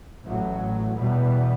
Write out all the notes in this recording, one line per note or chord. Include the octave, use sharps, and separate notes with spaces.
A1 A2 F#3
E2 B2 G3 B3